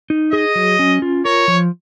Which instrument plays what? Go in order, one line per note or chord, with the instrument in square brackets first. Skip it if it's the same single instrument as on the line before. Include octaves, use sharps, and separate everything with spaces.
[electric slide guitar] D#4
[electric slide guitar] G#4 [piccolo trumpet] D#5
[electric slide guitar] F#3
C#4
F4
[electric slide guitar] A#4 [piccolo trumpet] C#5
[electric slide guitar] F3